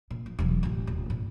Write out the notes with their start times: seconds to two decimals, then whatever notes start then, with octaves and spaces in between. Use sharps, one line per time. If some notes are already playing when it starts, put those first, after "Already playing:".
0.11 A#2
0.26 F3
0.39 E1 F#3
0.63 A1 F4
0.87 D#1
1.10 A#2